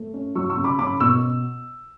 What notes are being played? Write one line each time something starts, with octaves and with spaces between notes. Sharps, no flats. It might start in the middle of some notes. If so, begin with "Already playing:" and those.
Already playing: A3
C#4
F#3 C#6 E6
C#6 E6
C#3
B5 D6
C#4 B5 D6
B2 C#6 E6